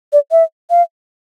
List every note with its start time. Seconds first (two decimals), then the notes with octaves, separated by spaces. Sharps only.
0.13 D5
0.31 E5
0.70 F5